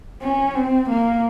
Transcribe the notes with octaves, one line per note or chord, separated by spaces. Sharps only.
C#4
C4
A#3